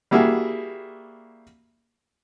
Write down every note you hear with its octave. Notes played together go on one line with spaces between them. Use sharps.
G3 A#3 E4 F#4 G#4